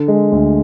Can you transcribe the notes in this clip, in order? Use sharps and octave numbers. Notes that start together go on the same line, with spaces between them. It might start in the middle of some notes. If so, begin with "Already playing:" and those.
Already playing: D3
G#3
D2